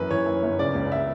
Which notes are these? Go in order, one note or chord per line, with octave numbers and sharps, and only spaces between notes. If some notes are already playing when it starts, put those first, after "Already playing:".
Already playing: F#2 E3 B4
E3 C#5
F#2
G1
C#3 D5
C#2
E5